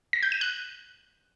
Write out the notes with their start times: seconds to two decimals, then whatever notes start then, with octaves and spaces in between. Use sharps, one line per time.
0.13 A#6
0.23 G6
0.32 D#7
0.41 F#6